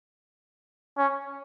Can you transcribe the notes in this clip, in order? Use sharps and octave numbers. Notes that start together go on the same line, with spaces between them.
C#4